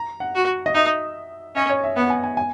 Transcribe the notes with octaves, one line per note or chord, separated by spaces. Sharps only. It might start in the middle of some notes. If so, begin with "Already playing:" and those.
Already playing: A#5
F#5
F#4
D#5
D#4 E5
C#4 D#5
C#5
E5
B3 F#5
G#5
G#5
G#5